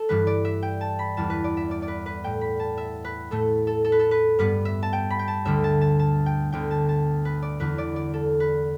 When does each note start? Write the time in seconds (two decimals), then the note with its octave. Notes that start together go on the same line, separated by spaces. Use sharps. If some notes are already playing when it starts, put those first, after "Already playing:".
Already playing: A4
0.09 G2 E3 G3 B4
0.27 D5
0.45 E5
0.63 G5
0.81 A5
0.99 B5
1.17 E2 E3 G3 A5
1.30 B4
1.44 D5
1.57 E5
1.71 D5
1.82 D5
1.88 B4
2.06 B4
2.24 A2 A3 G5
2.41 B5
2.60 A5
2.77 E5
3.05 B4
3.31 A2 A3 A4
3.67 A4
3.84 A4
3.92 B4
3.99 A4
4.11 B4
4.39 G2 G3 B3 B4
4.65 E5
4.83 A5
4.93 G5
5.10 B5
5.19 G5
5.28 A5
5.45 D2 D3 G3 E5
5.64 A5
5.81 A5
5.99 A5
6.26 G5
6.52 D2 D3 B3 G5
6.71 A5
6.89 A5
7.25 B4
7.42 D5
7.60 E2 D3 B3 B4
7.78 D5
7.96 D5
8.14 A4
8.40 B4